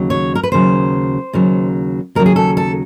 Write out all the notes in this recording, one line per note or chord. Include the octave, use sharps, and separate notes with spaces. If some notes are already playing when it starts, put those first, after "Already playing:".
Already playing: D#2 C#3 F#3
C#5
A#4
B4
D#2 C#3 F#3 C5
D#2 C#3 F#3
D#2 C#3 F#3 A#4
G#4
A4
A4